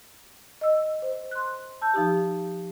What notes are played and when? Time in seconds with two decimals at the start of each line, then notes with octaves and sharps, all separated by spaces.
0.61 D#5 E6
1.02 C5
1.31 C6 F#6
1.82 A5 E6 G6
1.94 F3 D#4 G4